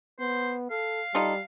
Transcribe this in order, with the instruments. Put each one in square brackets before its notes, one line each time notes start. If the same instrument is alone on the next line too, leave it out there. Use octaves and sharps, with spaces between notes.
[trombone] B3 [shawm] C5
[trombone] A4 [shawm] F5
[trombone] G3 [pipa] D#4 F4 A4